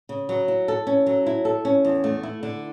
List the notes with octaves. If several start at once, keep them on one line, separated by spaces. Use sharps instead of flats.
C#3
F#3
E4
A4
C#4
F#3
E4
A4
C#4
E2
A3
E4
D3